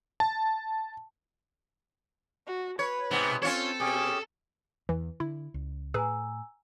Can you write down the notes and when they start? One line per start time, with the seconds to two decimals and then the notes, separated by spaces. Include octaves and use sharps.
0.20 A5
2.47 F#4
2.79 B4 C#5
3.11 G#2 C3 B3
3.42 C4 C#4 F4 A4 C#5
3.80 B2 C#4 G4 G#4
4.89 E2 E3
5.20 D3 E4
5.54 C#2
5.94 A2 G#4 B4 G#5 A#5 E6